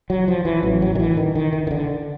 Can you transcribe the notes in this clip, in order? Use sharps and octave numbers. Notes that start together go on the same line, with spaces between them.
F#3
F3
E3
A1 A2 F#3
F#3
D#3
E3
D#3
D#3
D#3
D#3
D3